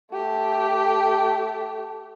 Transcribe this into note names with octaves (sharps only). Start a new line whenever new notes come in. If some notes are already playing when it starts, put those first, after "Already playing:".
A3 G4